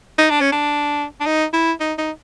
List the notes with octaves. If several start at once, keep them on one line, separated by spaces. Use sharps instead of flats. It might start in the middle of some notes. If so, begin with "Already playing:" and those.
D#4
D4
C#4
D4
D4
D#4
E4
D#4
D#4